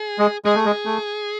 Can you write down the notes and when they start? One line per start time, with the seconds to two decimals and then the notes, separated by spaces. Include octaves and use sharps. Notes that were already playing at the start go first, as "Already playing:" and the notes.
Already playing: G#4
0.19 G#3
0.45 G#3 G#4
0.55 A3
0.65 G#3
0.85 A3